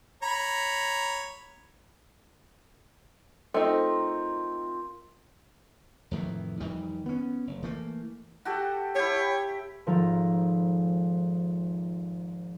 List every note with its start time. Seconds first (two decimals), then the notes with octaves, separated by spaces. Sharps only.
0.23 C#5 A#5 B5
3.54 A3 C4 D#4 F4 A#4
6.11 F2 A2 D#3 E3
6.60 F2 D#3 E3 G3
7.06 B3 C#4
7.47 F#1
7.63 E3 A3 A#3
8.45 F#4 G4 A4
8.95 E4 G4 C#5
9.86 G#1 F3 A4 A#5